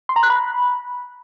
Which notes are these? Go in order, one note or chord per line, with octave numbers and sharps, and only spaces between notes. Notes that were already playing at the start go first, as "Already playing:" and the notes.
C6
A#5
F#6
B5